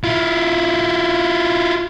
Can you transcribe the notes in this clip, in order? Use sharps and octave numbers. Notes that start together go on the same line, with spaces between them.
E4 F4